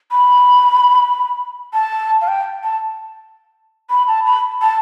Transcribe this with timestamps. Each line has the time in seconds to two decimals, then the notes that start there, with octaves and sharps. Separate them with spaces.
0.11 B5
1.73 A5
2.21 F5
2.28 G5
2.63 A5
3.90 B5
4.07 A5
4.26 B5
4.62 A5